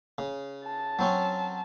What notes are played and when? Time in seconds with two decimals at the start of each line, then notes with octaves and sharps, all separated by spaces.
0.18 C#3
0.65 A5
0.99 F#3 C4 C#4